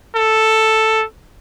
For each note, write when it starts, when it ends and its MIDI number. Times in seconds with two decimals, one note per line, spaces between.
0.16 1.04 69